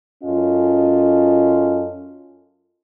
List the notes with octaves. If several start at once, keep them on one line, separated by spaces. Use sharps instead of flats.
F#2 C#4 F4 A4 D#5